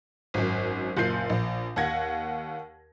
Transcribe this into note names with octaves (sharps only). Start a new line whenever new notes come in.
G#1 F#2
F#1 A#2 G6 C7
A#1
D#2 F#5 G#6 A#6